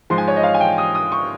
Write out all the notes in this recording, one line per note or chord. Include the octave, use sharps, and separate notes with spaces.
G#2 F3 G#3 C6
G#5
C#5
D#5
F5
G#5
G5
D#6
D#6
C#6